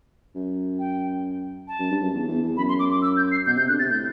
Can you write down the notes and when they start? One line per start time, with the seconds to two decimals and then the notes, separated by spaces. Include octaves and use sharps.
0.35 F#2
0.79 G5
1.68 A5
1.79 F#2
1.90 G2
2.02 F#2
2.13 E2
2.28 E2
2.42 E2
2.57 F#2 B5
2.69 C6
2.79 D6
2.91 D6
3.02 E6
3.17 G6
3.32 C7
3.46 B2 G6
3.57 C3 G6
3.68 D3 F#6
3.79 C3 A6
3.90 A2 G6